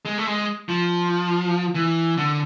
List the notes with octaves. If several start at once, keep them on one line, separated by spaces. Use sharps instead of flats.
G#3
A3
G#3
F3
E3
D3